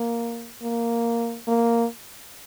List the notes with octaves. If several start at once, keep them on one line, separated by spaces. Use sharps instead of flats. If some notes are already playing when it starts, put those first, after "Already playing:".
Already playing: A#3
A#3
A#3